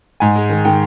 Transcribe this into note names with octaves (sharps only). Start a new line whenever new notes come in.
G#2 G#5
G#3
D#3
D#3 G5